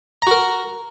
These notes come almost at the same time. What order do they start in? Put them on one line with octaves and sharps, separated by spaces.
A#5 F#4 A#4